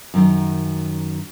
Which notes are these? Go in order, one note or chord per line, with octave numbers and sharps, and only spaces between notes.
F#2 D#3